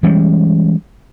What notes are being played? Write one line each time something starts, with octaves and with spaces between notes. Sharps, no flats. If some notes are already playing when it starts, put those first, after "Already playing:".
E3 G3 G#3 C#4